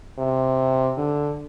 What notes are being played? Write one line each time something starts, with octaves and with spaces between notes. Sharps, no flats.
C3
D3